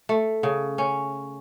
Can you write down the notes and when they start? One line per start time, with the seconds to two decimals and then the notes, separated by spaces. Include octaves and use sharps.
0.09 A3
0.43 C#3
0.78 C#4